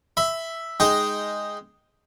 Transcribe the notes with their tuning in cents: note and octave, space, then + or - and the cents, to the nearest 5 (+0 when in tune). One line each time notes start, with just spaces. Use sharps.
E5 +0 B5 +30
G#3 +0 D#4 +0 G5 +0